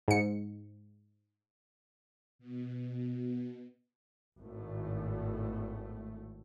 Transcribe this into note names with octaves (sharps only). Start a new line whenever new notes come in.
G#2 C#7
B2
G#1 A2 A3